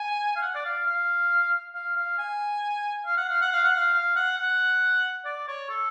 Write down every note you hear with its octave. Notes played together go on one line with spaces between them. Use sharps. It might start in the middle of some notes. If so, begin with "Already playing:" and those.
Already playing: G#5
F5
F#5
D5
F5
F5
F5
F5
G#5
F5
F#5
F5
F#5
F5
F#5
F5
F5
F#5
F#5
D5
C#5
A4